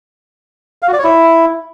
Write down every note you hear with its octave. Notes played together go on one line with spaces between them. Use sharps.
F5
F#4
D5
C#5
E4